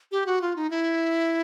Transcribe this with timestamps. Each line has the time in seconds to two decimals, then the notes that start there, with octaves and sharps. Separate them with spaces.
0.12 G4
0.26 F#4
0.41 F4
0.56 D#4
0.70 E4